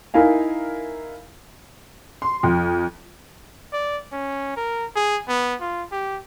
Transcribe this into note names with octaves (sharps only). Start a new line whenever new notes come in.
D#4 E4 A#4 F5 G#5
C6
F2
D5
C#4
A#4
G#4
B3
F4
G4